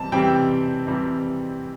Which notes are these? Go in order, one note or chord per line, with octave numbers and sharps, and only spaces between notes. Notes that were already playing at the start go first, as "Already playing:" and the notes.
Already playing: C3 E3 G3 C4 A5
C3 E3 G3 C4 G5
C3 E3 G3 C4